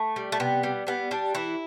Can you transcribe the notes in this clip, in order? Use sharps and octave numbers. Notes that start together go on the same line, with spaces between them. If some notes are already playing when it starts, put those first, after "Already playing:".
Already playing: A3
G3
A3
C3 B3
G3
G3 B3
G3 D4
E3 E4